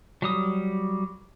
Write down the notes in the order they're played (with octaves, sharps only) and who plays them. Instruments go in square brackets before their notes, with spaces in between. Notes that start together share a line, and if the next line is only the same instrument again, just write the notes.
[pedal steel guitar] F#3 G3 D#6